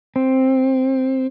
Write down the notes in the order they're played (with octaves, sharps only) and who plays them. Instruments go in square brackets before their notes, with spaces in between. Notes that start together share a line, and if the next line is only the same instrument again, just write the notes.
[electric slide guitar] C4